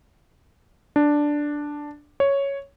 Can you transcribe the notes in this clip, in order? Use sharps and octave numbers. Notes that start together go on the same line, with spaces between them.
D4
C#5